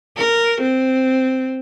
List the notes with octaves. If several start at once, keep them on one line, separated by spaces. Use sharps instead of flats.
A#4
C4